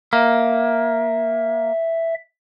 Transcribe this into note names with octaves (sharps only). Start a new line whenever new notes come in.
A#3 E5